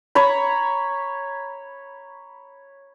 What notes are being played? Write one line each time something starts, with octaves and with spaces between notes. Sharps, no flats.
C#5 A#5 B5